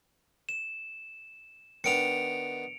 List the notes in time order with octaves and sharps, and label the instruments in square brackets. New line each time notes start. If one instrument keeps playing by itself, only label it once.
[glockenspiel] E7
[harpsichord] D#3 B3 D4 [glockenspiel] C#7 D7 F7